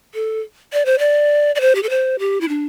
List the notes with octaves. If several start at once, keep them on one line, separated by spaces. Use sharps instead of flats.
A4
D5
C5
D5
D5
C5
G4
A4
C5
G4
E4
D4